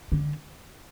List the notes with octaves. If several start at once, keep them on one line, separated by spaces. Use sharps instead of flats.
D3